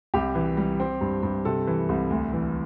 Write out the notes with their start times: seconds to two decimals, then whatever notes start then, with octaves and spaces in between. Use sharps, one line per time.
0.14 C2 G4
0.35 E3
0.57 G3
0.80 C4
1.01 G2
1.23 G2
1.45 C3 A4
1.67 E3
1.89 C2
2.10 D2
2.33 E3